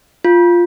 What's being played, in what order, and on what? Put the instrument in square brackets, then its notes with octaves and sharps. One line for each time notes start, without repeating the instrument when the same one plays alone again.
[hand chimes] F4